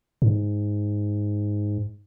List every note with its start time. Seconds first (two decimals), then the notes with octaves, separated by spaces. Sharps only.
0.22 G#2